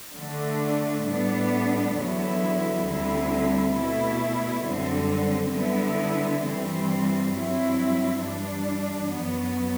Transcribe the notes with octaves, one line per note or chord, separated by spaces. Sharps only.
D3 A3 D4
A2 G3 B3 D4
E2 D3 F#3 B3 E4
D2 D3 G3 C4 E4
B2 A3 E4
F#2 D3 G3 C4
D3 G3 B3 E4
G2 E3 G3 C4
G2 F#3 C4 E4
G2 E3 G3 D4
F#2 F#3 B3